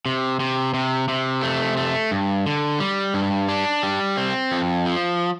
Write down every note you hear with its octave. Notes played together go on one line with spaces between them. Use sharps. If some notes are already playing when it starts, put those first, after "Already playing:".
C3
C3
C3
C3
A3
A3
G2
D3
G3
G2
D4
G3
C4
F2
F3